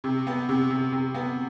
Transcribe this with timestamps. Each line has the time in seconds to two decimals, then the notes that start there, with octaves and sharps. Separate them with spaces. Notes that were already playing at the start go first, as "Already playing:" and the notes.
0.04 C3
0.27 B3
0.49 C3
0.70 C3
0.92 C3
1.15 B3